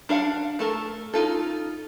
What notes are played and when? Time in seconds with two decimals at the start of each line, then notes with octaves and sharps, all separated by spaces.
0.09 D4 A#4 F5 F#5
0.59 A3 A4 A#4
1.14 D#4 F4 A4